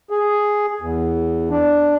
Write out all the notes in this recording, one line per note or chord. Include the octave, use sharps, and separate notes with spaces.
G#4
E2
D4